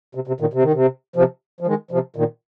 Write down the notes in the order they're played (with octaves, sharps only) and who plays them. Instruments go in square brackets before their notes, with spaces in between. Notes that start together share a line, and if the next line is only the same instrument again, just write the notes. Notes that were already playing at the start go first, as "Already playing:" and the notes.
[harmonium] C3
C3
A#2 D#3
C3
D#3
C3
C3 F3
F3
D#3 G#3
C3 F3
A#2 D#3